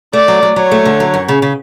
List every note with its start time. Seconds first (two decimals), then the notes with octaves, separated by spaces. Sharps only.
0.13 A3 D5
0.28 F#3
0.43 F#3
0.56 F#3 C#5
0.72 A3
0.85 D3
1.00 F#3
1.14 F#2
1.28 C#3
1.42 C#3